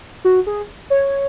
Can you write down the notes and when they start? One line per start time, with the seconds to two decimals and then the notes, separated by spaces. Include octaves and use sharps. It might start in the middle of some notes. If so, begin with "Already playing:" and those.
0.25 F#4
0.47 G#4
0.90 C#5